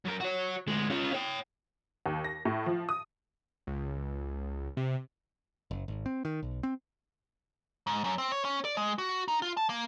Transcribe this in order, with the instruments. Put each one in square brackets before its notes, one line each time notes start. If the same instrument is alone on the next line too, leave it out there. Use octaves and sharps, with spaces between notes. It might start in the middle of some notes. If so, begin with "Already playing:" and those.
[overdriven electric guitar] F#2 A#4
F#4 C#5
D2 G#3
C#4 F4
C#5 G5
[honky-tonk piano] D#2
A#6
A2
F3
D#6
[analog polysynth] C#2
C3
[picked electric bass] F#1
G#1
C4
D#3
B1
C4
[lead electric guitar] G#2
F#2
C4
C#5
C#4
D5
G#3
F#4
D#4
F4
A5
A#3